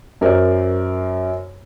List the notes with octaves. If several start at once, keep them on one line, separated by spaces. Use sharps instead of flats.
F#2 A#4 C5 D5